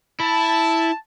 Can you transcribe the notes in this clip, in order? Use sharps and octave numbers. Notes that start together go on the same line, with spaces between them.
E4 A5